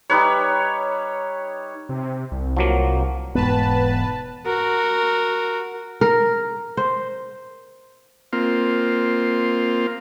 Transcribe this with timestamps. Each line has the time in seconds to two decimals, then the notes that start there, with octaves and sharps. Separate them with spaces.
0.10 G3 D#4 B4 C#5
1.89 C3
2.32 C2
2.57 F3 F#3 A#3
3.35 E1 G#2 B3 B4 A5
4.46 F#4 A#4
6.01 A#4
6.77 C5
8.33 A#3 C4 F4